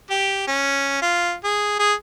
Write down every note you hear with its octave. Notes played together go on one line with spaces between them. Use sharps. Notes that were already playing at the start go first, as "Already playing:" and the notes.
G4
C#4
F4
G#4
G#4